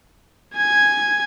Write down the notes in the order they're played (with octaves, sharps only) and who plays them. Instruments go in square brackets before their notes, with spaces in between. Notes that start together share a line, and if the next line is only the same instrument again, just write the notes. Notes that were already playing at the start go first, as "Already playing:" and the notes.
[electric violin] G#5 G#6